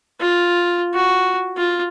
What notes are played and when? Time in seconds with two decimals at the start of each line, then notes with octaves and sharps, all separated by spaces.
0.20 F4
0.93 F#4
1.57 F4